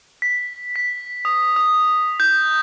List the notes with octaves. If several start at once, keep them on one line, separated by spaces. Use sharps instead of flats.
B6
B6
D#6
D#6
G6